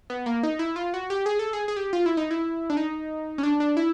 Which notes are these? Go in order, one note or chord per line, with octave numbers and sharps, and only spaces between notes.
B3
A#3
D#4
E4
F4
F#4
G4
G#4
A4
G#4
G#4
G4
F4
E4
D#4
E4
D4
D#4
C#4
D4
D4
E4